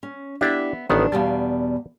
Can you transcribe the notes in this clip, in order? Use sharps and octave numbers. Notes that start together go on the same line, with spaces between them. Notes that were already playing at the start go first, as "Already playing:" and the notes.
C#4
B3 D4 E4 G4 C5 E5
A1 D#3 B3 D4
E2 B2 G3 F5 A5